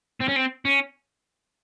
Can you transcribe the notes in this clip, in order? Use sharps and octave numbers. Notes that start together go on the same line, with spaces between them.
C4
C#4
C4
C#4